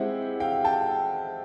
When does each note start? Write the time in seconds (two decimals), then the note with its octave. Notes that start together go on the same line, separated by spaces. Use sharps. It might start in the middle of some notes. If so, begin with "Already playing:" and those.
Already playing: G#3 C4 E4 G4 E5 F#5
0.40 F5 G5
0.64 G5 A5